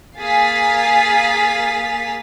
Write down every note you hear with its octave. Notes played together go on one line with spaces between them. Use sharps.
A#3 G#4 F5 A6 B6